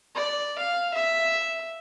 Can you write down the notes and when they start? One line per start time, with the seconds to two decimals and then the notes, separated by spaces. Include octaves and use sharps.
0.15 D5
0.59 F5
0.94 E5